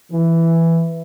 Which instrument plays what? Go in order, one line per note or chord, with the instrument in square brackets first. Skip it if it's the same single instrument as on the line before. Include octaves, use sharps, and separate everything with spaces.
[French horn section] E3